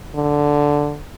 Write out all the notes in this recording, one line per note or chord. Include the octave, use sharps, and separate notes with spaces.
D3